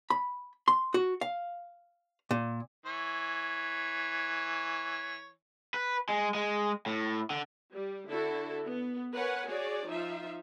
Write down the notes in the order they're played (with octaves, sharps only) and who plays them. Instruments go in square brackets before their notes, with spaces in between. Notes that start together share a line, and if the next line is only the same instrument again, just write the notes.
[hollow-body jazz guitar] B5
C6
F#4
F5
A#2
[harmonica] E3 C#5
[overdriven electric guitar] B4
G#3
G#3
A2
D3
[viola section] G3
D3 E4 F#4 A4
B3
A#4 B4 C#5 F#5 G#5
F#4 G#4 C#5 D5
F3 D#4 F4 E5